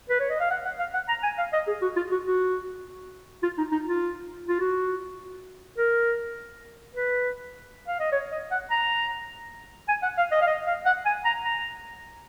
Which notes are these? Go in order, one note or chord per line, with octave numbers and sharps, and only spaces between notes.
B4
C#5
D#5
F5
F#5
F#5
F5
F#5
A#5
G#5
F5
D#5
G#4
F#4
F4
F#4
F#4
F4
D#4
D#4
F4
F4
F#4
A#4
B4
F5
D#5
C#5
D#5
F#5
A#5
G#5
F#5
F5
D#5
F5
D#5
F5
F#5
G#5
A#5
A#5